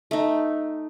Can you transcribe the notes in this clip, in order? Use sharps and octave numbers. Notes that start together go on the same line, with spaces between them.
A3 D#4